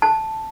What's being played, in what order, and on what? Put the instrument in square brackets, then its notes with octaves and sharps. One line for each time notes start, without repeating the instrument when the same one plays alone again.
[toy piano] A5